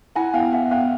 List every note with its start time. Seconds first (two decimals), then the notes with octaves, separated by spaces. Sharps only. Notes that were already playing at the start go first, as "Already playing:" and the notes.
0.15 E4 F#5 G#5
0.34 B3 F5 G5
0.52 B3 E5 F#5
0.71 B3 F5 G5